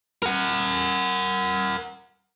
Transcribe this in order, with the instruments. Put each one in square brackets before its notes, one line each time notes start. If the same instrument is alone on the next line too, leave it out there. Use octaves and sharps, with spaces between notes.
[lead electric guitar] A#4 F#5